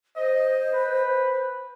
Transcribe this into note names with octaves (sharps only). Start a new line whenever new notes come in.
C5 D#5
B4